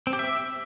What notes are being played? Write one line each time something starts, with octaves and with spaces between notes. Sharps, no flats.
C4
G4
E5